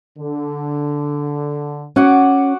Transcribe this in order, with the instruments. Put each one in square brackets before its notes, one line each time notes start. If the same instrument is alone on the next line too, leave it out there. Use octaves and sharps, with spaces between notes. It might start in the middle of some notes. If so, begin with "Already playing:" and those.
[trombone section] D3
[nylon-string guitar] C#4 [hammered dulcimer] F#4 F#5 D6